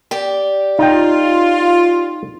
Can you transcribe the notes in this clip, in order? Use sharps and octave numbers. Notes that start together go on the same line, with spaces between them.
G4 D5
D#4 F4 G5